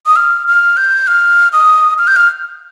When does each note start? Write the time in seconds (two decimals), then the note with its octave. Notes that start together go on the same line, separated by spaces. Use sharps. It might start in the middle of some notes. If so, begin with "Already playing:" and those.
0.06 D#6
0.16 F6
0.47 F6
0.77 G6
1.07 F6
1.53 D#6
1.98 F6
2.07 G6
2.16 F6